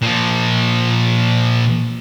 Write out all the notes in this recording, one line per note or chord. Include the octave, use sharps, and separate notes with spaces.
A#2 F3